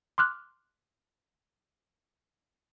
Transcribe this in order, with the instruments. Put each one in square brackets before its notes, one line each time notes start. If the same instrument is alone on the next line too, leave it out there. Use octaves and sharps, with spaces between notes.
[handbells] C6 D6 F6 F#6